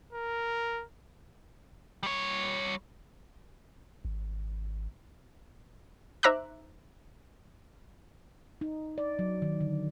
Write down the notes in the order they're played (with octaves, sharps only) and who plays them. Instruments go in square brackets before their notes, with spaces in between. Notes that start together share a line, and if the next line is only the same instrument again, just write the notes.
[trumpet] A#4
[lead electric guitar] G3 C#5
[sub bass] G#1
[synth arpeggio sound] D#4 C5 E5 A#5 D6 F#6
[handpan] D#4
D5
F#3
D#3
D3